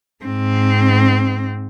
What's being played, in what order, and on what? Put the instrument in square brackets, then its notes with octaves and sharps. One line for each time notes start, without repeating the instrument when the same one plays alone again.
[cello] G#2 C4